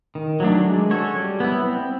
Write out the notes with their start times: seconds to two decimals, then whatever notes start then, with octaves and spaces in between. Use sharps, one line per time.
0.15 D#3
0.40 F#3 A3 D4
0.65 G#3
0.90 C#4 F#4 A4 C#5
1.16 G3
1.40 B3 E4
1.66 C4